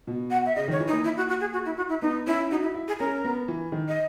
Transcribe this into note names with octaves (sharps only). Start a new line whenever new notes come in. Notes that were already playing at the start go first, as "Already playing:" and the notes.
B2
F#5
E5
C#3 D#5
D#3 C#5
E3
D#4
A#3
E4
F#4
F#4
G#4
F#4
E4
F#4
E4
B3 D#4
C#4 E4
D#4 F#4
E4
E4
G#4
C#4 A#4
B3
E3
D#3
D#5